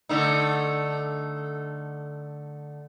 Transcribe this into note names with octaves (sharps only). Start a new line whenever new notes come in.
D3 A3 D#4